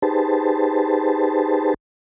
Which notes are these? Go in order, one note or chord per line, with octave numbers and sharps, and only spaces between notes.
D#4 G4 G#4 B4 C5 A5